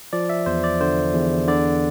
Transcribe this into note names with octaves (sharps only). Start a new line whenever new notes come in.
F3 D5
E5
E2 C5
D5
D3 C5
E2
D3 D5